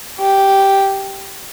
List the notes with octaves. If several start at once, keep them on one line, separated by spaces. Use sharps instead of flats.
G4